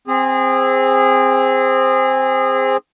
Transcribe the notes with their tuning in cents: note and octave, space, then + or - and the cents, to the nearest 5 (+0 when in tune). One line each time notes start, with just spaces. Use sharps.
C4 +0 G#4 -25